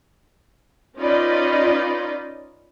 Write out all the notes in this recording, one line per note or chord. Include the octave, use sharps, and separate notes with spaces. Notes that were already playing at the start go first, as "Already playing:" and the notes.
C#4 D#4 F4 B4 D5 D#5